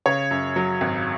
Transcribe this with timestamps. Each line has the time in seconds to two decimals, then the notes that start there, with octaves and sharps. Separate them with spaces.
0.06 C#3 C#5
0.31 F#2
0.56 F#3
0.81 G#1